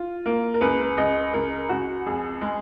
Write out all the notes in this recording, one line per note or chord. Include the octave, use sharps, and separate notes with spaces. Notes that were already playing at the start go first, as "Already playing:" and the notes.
Already playing: F4
A#3
A#4
C#2 B4
C#2 D#5
C#2 A#4
C#2 F#4
F2 G#4
G#3